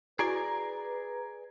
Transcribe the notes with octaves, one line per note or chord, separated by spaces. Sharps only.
E4 F#4 G#4 B4 D5 G#5 A#5